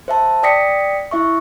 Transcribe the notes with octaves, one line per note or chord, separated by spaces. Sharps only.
C5 E5 A5
D5 G5 D#6 A#6 B6 C#7
E4 E5 C#6